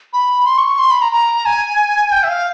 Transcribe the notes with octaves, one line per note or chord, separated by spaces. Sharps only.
B5
C6
C#6
C#6
C6
B5
A#5
A#5
G#5
G5
E5
F5